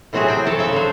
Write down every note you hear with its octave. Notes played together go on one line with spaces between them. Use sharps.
A2 C3 F#3 C4 F#4 G#4
G5 G#5
C4 A4 C#5
C#3 F#3 E5
D3 D4 C5